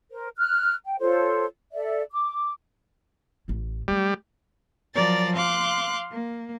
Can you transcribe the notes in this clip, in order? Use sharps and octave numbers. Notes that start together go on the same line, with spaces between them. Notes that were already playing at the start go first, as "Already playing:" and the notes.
A#4 C5
F6 F#6
G5
F4 A4 C5 C#5
A4 D5 E5
D6
A1 E3
F#3 G3 A3
F3 F#3 A#4 D5 A6
F5 C6 D6 F#6
A#3